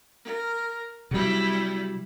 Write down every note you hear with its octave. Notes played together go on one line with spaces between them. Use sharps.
A#4
C3 F#3 G3 E4